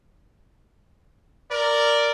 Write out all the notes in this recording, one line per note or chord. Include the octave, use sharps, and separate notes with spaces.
A#4 D5